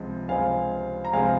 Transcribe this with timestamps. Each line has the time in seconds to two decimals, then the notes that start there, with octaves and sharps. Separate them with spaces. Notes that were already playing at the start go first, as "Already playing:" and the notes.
Already playing: C#2 C3 F3 G#3
0.28 C#2 C3 F3 G#3 F5 G#5
1.05 A#5
1.13 C#2 C3 F3 G#3 F5 G#5